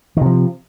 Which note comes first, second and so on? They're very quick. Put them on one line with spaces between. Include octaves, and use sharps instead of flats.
D#3 C3 F3